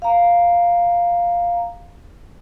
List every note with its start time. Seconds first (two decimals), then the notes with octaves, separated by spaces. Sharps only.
0.02 F5 A#5